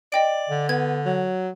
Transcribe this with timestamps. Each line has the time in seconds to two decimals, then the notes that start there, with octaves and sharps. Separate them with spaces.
0.12 D5 D#5 G5 D7
0.49 D3
0.69 B3 G#6
1.06 F#3